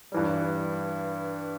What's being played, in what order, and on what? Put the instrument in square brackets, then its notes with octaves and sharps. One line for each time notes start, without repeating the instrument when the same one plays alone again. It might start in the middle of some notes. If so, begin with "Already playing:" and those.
[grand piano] G2 E3 G3